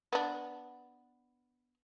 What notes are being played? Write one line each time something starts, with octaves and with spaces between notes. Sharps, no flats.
B3 D4